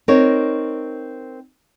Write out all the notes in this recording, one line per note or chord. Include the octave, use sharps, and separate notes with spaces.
C4 D#4 A#4 C#5